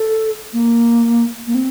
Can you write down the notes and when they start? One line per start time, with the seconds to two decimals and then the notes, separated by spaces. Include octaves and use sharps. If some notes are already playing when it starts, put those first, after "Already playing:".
Already playing: A4
0.53 A#3
1.47 A#3
1.55 C4